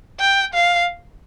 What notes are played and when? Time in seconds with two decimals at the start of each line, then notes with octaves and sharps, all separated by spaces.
0.20 G5
0.54 F5